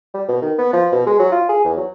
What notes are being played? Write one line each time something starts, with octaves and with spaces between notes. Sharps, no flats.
G3
B2
D#3
B3
F3
B2
G#3
F#3
F4
G#4
E2
F#3